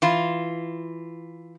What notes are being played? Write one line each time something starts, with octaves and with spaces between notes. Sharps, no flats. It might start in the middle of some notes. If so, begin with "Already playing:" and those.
E3 F4